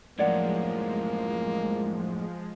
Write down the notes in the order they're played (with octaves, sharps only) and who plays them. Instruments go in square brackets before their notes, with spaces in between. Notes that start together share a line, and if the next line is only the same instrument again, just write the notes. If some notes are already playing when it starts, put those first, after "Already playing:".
[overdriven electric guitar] F#2 A2 [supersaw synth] F3 G#3 [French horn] A#3 [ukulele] C#5 D5 F#5